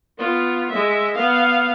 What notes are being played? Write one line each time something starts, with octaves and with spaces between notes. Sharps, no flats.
B3 F4
G#3 E5
B3 F5